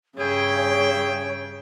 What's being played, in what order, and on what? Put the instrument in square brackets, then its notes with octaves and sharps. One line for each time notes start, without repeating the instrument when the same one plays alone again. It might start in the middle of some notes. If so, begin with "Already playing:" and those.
[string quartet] G2 C#3 [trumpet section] E4 G5 [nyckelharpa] G#4 [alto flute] C#5